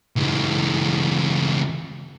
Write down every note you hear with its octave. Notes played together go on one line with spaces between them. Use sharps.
C#2 E3